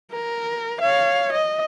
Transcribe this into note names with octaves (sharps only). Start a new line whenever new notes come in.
A#4
C#5 F5
D#5